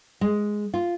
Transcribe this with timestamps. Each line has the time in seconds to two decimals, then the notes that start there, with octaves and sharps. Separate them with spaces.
0.21 G#3
0.74 F4